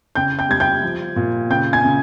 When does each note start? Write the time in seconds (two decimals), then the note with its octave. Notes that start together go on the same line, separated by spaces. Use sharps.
0.15 C#3 G5 G6
0.39 G5 G6
0.49 G3 G#6
0.60 G5 G6
0.83 F3
1.16 A#2
1.50 C#3 G5 G6
1.73 G#5 G#6
1.84 C#3